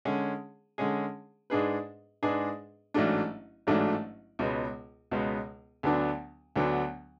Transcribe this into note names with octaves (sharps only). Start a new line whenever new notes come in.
D3 G#3 C#4 G#4
D3 G#3 C#4 G#4
G#2 G#3 D4 G#4 B4
G#2 G#3 D4 G#4 B4
A1 G#2 F#3 A3 D4
A1 G#2 F#3 A3 D4
C#2 B2 G#3 B3
C#2 B2 G#3 B3
D2 D3 F#3 B3 D4
D2 D3 F#3 B3 D4